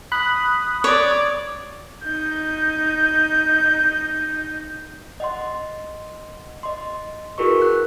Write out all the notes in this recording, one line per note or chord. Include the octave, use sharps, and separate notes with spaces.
B5 D#6 F#6
C#5 D5
D#4 G6
D#5 F#5 C6
D#5 C6
E4 F#4 G#4 A#4 B4 C#6
F#6